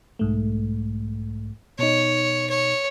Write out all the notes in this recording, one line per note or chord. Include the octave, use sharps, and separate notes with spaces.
B1 G#2 A3
B2 D#4 C#5
C#5